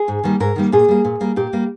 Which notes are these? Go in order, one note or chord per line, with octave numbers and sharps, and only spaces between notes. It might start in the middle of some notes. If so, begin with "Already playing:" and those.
Already playing: G#4
G#2
D#3 G3 A#3
G#2 A#4
D#3 G3 A#3
A#2 G#4
G3 A#3
A#2
G3 A#3
A#2 G4
G3 A#3